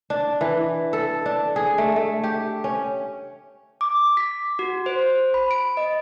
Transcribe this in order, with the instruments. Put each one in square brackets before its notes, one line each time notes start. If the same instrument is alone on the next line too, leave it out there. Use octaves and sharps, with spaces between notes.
[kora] D4
E3
A4
D4
G#4
A3
A3
G4
C#4
[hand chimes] D6
B6
F#4
C5
B5
D7
D#5